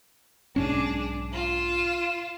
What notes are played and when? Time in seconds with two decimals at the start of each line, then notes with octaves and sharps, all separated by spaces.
0.56 B1 G#2 C#4 D4 G#4
1.33 F4 E7